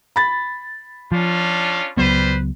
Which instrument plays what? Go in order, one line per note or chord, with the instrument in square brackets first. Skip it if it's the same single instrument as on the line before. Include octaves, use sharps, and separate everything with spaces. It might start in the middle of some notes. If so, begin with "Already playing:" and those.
[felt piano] B5 A6
[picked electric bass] F3 [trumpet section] C#4 D4 F4
[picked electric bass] C#2 F#3 B3 [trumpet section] G3 B4 C5